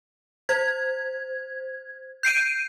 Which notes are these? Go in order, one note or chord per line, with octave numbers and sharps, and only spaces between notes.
C5 G#6
G6 C7 D7 D#7